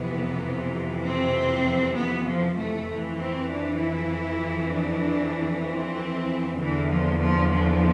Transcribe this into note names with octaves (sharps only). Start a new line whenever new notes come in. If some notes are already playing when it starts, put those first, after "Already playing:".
Already playing: F2 C3 E3 B3
C4
B3
F3
A3
F2 E3
C4
D4
E4
D4
C4
E2 D3 E3
F3
F3
F3